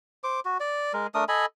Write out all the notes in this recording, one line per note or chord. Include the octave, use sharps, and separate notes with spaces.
C5 D6
F#4
D5
G#3 A#4
A3 D4 A#4 D#6
A4 D#5 G#5 B5